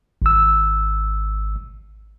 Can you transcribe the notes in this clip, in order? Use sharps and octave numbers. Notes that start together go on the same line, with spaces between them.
G#1 E6